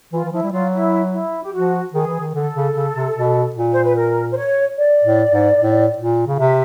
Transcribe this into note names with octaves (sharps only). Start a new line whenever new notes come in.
E3 F4
E3
F3 E4
G3
F#3 F4
E4
E4
G4
F3 F#4
D#3 G#4
E3
D#3
D3 A4
C#3
C#3
C3
B2
A#2
C5
B4
A#4
C5
C#5
D5
A2
G#2
A2
A#2
C#3
C3 E5